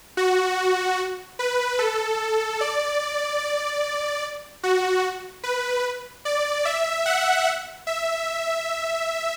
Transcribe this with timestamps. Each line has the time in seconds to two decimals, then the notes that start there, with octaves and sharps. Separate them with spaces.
0.17 F#4
1.39 B4
1.79 A4
2.61 D5
3.41 D5
4.63 F#4
5.44 B4
6.25 D5
6.65 E5
7.06 F#5
7.87 E5